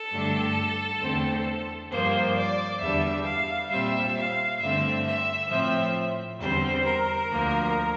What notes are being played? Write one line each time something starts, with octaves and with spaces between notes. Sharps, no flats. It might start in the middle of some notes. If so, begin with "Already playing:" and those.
Already playing: A4
G2 D3 A3 D4
E2 D3 A3 C4
G2 F3 A#3 C5
D5
E2 D3 G3 D4 E5
F5
A#2 G3 C4 E5
F5
G2 D3 A3 C4 E5
E5
A2 F3 C4 E5
E2 D3 G3 C4 C5
A#4
D2 D3 F3 A#3